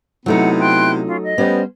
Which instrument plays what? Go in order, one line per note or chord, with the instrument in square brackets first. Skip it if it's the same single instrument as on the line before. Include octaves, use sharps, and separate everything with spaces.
[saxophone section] C3 B3 E4 [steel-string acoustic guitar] F#3 A3 D#4 [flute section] F#5
[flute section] G5 C6 F#6
C#4 F4
D#5
[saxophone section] G3 B3 [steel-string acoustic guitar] C#4 C5